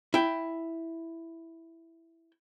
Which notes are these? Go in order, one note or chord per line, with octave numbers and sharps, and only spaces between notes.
E4 G5